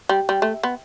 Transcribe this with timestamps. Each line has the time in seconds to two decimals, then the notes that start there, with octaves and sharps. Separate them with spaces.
0.09 G3
0.29 G3
0.42 A3
0.63 B3